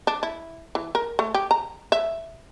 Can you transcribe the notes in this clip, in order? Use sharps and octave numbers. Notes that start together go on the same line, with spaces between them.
D4
E4
E3
A#4
A3
G4
A#5
E5